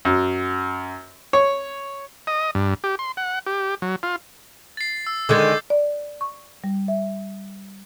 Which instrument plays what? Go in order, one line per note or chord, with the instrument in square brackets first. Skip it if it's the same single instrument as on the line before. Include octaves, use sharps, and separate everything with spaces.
[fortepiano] F#2
C#5
[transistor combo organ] D#5
G2
G4
C6
F#5
G4
F#3
F4
[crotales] A6 C7
E6
[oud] D3 D#3 G#3 [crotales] D6 G6 A6
[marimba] D5
C#6
G3
E5